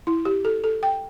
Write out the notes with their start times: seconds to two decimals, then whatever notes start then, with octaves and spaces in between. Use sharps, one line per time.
0.07 E4
0.25 G4
0.45 A4
0.64 A4
0.83 G5